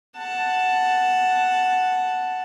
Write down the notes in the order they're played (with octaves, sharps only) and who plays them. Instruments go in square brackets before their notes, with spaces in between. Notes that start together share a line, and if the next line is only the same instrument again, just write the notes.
[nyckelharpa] F#5 A5